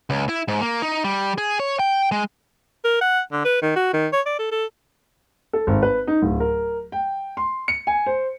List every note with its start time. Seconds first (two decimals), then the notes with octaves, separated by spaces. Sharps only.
0.10 C#2
0.29 E4
0.48 G#2
0.61 A#3
0.82 D#4
1.04 G3
1.38 G#4
1.60 C#5
1.80 G5
2.12 G#3
2.85 A#4
3.01 F#5
3.32 D3
3.45 B4
3.62 D#3
3.76 F#4
3.93 D#3
4.13 C#5
4.26 D5
4.39 A4
4.51 A4
5.53 A4
5.67 G#1
5.83 B4
6.07 D#4
6.22 D1
6.40 A#4
6.92 G5
7.37 C6
7.68 C#7
7.87 G#5
8.06 C5